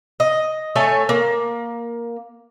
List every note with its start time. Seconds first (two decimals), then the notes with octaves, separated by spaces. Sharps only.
0.20 D#5
0.76 A3 A4 C#5 G#5
1.09 A#3